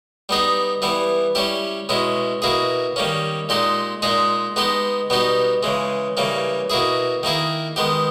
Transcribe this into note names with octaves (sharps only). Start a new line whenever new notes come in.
G3 B3 D#4 G#4
E3 G3 B3 E4
G3 C#4 E4 G4
B2 G#3 C#4 E4
B2 A#3 E4 G#4
D#3 G3 A#3 C#4
A#2 G#3 D#4 G4
A#2 G#3 D#4 G#4
G#3 B3 D#4 G4
B2 G3 B3 D#4 G4
C#3 E3 G#3
C#3 E3 G3 A#3
B2 A#3 E4 G#4
D#3 A#3 E4 G#4
D#3 G#3 B3 G4